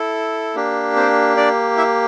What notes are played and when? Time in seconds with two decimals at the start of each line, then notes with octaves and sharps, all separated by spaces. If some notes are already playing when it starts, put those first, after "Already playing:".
Already playing: E4 A4
0.55 A#3 D4 G4
0.96 C4 C5
1.37 D4 D5
1.77 E4 E5